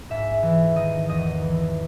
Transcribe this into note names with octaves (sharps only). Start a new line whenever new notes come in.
G#2 E5
E3
D#3 D#5
E2 D#5
E3